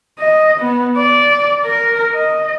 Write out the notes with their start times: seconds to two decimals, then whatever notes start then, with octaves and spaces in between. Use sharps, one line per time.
0.20 D#5
0.60 B3
0.97 D5
1.65 A#4
2.14 D#5